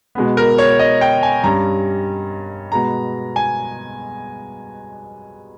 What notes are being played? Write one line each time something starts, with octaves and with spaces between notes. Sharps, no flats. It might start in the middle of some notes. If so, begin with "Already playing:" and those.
B2 G#3 B3
A#4
C#5
C#5
D#5
G5
G#5
G2 G3 C#4 A#5
B2 G#3 B3 A#5
G#5